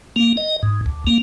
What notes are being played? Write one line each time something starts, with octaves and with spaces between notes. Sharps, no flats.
A#3
D#5
G#2
D2
A#3